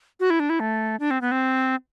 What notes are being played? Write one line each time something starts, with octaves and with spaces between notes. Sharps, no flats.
F#4
E4
D4
E4
A3
D4
C4
B3
C4